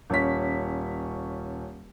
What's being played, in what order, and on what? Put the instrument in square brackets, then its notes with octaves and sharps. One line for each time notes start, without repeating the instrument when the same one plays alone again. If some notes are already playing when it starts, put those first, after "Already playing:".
[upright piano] D#1 C#4 B6